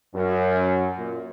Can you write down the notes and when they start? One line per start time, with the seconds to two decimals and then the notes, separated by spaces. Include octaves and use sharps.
0.14 F#2
0.98 A#2